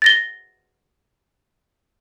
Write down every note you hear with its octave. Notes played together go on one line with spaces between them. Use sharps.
A6 A#6 G7